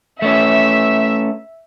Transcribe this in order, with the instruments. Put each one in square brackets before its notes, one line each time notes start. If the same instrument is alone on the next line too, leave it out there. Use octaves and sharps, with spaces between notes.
[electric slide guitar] A3 C#4 [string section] E5